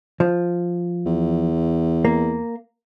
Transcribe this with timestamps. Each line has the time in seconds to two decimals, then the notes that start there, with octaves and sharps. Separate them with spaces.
0.20 F3
1.06 E2
2.05 A#3